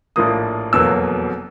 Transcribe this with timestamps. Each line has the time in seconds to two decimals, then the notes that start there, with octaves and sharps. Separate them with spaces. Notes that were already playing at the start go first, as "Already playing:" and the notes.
0.16 A#1 A2 F3 A#3 D#6
0.73 F1 E2 B2 F#3 A#3 E6